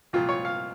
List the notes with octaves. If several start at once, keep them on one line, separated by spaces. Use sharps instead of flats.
C2 A#2 F3 F4
C#5
F5